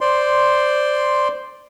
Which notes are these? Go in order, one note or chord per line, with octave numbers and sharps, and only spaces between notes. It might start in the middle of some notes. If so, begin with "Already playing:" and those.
C5 D5 C6